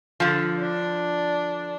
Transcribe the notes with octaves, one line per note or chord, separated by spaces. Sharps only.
D3 F3
D4